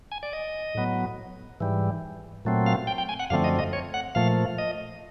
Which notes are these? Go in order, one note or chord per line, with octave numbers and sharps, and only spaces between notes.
G#5
D5
D#5
A2 F#3 B3
G#2 E3 G3
A#2 F#3 A3 C4
F5
G5
G5
G#5
F#5
F#2 D3 F3 A3 C4 F5
D#5
D#5
C#5
F#5
A#2 F3 A3 F5
D#5